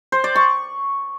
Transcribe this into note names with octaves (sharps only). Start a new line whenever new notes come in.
C5
D5
C#6